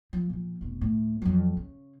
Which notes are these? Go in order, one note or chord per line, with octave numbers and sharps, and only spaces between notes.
F3
A#2 F3
F1 B2
D2 A2
F2 F#3
C#3